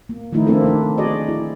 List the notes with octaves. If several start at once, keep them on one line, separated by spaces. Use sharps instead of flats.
A#3
D#3 F3 A3 A#3 D#4 E4
A#3 C4 D4 E4 A4
D4 D#4
F#4 G#4 D5 D#5
E4